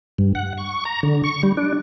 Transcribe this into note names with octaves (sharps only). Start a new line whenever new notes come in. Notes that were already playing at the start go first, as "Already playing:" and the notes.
G2
F#5
C#6
A#5
D3
C#6
G3
D4